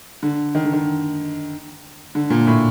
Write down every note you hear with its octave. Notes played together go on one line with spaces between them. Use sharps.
D3
D#3
D3
D#3
D3
A#2
A2